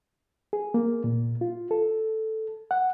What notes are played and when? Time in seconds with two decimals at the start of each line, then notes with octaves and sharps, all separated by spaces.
0.53 G#4
0.74 A#3
1.04 A#2
1.41 F4
1.71 A4
2.71 F#5